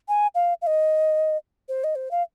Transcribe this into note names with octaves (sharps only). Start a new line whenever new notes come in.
G#5
F5
F5
D#5
C5
D#5
C5
F5